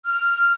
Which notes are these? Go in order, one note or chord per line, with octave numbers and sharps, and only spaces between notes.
F6